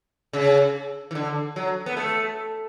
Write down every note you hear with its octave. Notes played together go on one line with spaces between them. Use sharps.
C#3
E3
D3
F#3
B3
A3